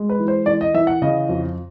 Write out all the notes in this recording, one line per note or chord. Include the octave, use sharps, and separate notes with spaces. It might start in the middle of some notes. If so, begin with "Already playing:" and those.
Already playing: G#3
B4
E3
C5
E3 D5
D#5
E3 E5
F#5
C#3 D#5
F2